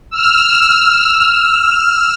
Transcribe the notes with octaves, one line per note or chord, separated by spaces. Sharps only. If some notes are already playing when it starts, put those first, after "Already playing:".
E6 F6